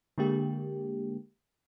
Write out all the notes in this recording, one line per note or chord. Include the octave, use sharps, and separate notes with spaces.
D3 G#3 A#3 G4